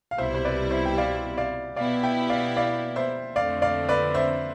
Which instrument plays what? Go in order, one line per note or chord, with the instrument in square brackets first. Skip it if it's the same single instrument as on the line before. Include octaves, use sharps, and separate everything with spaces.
[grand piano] F5
[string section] C2 B2 G3 C4 E4 [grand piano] C5 E5
[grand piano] C5
B4 D5
C5 E5
G5
D5 F5
D5 F5
[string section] B2 B3 E4 G4 [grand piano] D5 F5
[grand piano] E5 G5
D5 F5
D5 F5
C5 E5
[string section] F2 D3 A3 C4 [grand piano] D5 F5
[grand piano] D5 F5
B4 D5
C5 E5